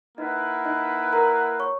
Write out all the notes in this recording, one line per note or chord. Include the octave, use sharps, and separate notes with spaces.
A#3 D#4 E4 B4 D#5 F#5
D#4 D#5
A#4 A#5
C#5 C#6